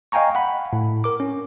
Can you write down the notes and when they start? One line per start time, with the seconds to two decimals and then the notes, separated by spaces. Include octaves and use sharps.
0.12 D#5 F5 G5 G#5 A#5 C#6
0.35 F#5 B5
0.73 A2
1.04 A#4 D6
1.20 C#4